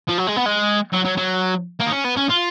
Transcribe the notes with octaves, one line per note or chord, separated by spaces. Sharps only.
F3
F#3
G#3
B3
G#3
F#3
F#3
F#3
A#3
D#4
C#4
B3
C#4
F4